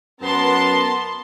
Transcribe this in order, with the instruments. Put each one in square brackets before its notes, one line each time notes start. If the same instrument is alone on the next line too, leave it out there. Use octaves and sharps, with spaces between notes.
[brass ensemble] F#2 B3 [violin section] A#4 A5 C6